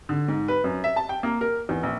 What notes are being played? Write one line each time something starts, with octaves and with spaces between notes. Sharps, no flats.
D3
G#2
B4
F#2
E5
A5
G5
A#3
A#4
E2
A#1